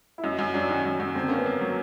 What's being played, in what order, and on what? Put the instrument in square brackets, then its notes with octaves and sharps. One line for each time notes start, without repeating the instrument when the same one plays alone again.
[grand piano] E4
[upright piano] F#2 [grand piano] D#4
[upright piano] F#2 [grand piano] C#4
[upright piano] F#3 [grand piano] D4
[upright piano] D#3 [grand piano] C#4
[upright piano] F#2
[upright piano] F#2 [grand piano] C#4
[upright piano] D3 [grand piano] C4
[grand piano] A#3 [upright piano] C#4
[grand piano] B3
[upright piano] A#3
F#3